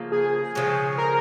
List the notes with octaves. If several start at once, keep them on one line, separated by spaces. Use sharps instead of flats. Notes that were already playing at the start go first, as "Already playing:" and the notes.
Already playing: C#3 F3 A#3
G#4
C#3 F3 G#3 C#4
A#4